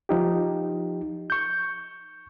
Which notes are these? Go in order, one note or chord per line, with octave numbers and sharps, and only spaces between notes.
F3 D#4 G4
C#6 G6